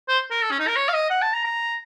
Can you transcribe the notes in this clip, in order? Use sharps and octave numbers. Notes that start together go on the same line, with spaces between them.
C5
A#4
A4
C#4
D#4
A#4
C#5
F5
D#5
F#5
A5
A#5
A#5